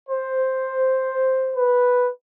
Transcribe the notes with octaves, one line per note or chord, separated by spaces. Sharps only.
C5
B4